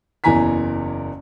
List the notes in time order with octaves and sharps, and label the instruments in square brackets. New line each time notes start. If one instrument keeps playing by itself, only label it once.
[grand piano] F#1 E2 E3 G#5 A#5 B6